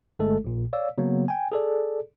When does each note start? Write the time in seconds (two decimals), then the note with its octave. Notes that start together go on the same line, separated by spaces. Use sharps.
0.19 G1 G#3 A3 A4
0.44 A#1 A#2
0.73 C#5 D5 F5 E6
0.98 C#3 F#3 A#3 B3
1.28 G5 G#5
1.52 G#4 A4 D5